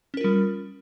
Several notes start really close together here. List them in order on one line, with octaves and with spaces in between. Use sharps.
C#4 A#4 F4 G3